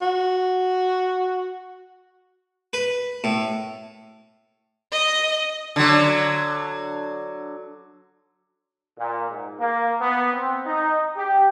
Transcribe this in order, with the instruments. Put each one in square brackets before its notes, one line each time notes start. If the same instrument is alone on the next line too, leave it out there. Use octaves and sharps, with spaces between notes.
[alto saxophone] F#4
[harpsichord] B4
A2
[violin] D#5
[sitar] D3 F#3
[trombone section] A#2
G#2
A#3
B3
C4
D#4
G4